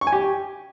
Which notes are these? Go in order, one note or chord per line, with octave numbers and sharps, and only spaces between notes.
C#6
G#5
G4